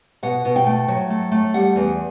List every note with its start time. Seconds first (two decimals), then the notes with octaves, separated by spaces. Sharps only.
0.23 B2 F#5
0.45 B2
0.56 G5
0.66 A3
0.88 F#3
1.10 A3
1.32 A3
1.54 G3 F#5
1.76 E2